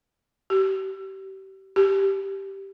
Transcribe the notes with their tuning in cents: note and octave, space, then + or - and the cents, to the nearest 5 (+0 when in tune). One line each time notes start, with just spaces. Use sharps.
G4 -30
G4 -5